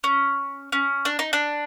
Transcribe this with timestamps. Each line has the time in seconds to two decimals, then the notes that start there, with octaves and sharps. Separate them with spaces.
0.04 C#4
0.72 C#4
1.05 D4
1.19 D#4
1.33 D4